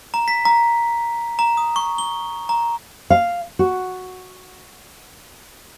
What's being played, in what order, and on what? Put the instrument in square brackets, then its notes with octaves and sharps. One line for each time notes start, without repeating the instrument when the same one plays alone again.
[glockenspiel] A#5
B6
A#5
A#5
D#6
C#6
G7
A#5
[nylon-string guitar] F5
F#4